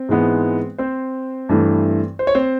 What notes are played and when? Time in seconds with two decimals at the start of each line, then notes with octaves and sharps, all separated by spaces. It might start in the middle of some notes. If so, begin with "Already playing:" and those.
Already playing: C4
0.09 G#2 E3 G#3 B3
0.78 C4 C5
1.49 G2 E3 A3
2.19 C5
2.27 C#5
2.35 C4 C5